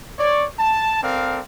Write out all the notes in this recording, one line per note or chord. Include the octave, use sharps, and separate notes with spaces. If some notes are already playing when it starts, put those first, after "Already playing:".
C#5 D5
A5
C4 A4 A#4 D5 F5